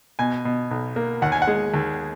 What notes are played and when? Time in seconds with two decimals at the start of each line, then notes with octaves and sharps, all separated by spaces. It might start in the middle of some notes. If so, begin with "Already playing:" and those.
0.19 B2 G#5
0.45 B2
0.71 B1
0.96 A#3
1.22 D#2 F#5
1.32 G#5
1.42 F#5
1.47 G#3
1.74 D#2